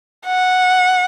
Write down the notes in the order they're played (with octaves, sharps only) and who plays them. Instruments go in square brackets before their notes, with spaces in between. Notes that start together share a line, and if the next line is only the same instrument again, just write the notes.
[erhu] F#5